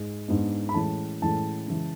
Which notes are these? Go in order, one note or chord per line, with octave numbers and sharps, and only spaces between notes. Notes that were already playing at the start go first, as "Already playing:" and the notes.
Already playing: G#2 G#3
G#2 G#3 B3 D4
B5
A2 E3 G#3 C#4 A5
A2 E3 G#3 C#4 A5
C#3 E3 G#3